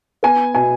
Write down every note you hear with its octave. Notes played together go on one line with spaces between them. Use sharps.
B3 G#5
B2 G#5